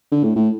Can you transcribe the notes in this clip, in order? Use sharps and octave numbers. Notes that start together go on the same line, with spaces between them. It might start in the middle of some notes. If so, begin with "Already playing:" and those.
D3
A2
A2